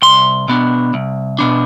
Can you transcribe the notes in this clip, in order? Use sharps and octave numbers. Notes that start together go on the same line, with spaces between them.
C2 C6
B2 B3 D4
C2
B2 B3 D4